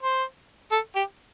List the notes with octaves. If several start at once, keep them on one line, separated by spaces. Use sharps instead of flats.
C5
A4
G4